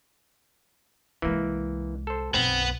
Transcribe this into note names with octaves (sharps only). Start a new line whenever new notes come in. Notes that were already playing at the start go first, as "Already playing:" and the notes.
C2 E3 G#3 A#3
A4 C5
B1 F#2 B3 C4